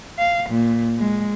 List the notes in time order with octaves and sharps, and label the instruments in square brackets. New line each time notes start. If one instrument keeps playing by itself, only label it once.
[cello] F5
A#2
G#3